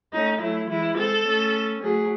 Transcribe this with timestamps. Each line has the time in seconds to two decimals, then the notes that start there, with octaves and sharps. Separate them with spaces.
0.13 A3 C#4 D#4
0.41 F#3 A3 E4
0.69 E3 G#3 E4
0.98 G#3 C4 A4
1.26 A3 C#4
1.82 F#3 A3 G#4